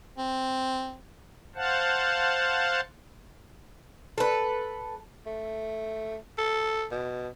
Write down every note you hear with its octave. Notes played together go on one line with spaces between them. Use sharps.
C4
C5 F5 F#5 A5
A4 B4
A3
A4
B2